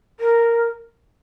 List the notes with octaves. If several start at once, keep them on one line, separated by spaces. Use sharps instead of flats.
A#4